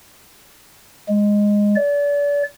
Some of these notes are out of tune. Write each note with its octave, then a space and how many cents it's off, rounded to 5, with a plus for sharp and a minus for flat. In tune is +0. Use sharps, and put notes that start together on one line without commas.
G#3 -10
D5 -35